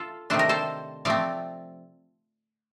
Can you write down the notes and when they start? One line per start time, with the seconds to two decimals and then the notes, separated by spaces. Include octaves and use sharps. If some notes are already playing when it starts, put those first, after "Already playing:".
Already playing: F4 A4
0.30 C3 D#3 A3 D4 C5
0.39 A#4
0.49 A4 C5
1.05 F3 A3 C4 D5 F5